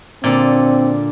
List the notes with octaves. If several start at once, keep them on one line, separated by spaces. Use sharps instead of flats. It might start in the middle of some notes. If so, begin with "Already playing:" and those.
A#2 D3 C4